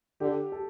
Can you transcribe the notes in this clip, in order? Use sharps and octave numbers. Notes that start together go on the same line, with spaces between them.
D3 G4
A4